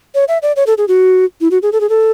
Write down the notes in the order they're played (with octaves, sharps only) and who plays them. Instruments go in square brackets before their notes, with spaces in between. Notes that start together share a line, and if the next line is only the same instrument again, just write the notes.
[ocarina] C#5
E5
D5
C#5
A4
G#4
F#4
E4
F#4
G#4
A4
G#4
A4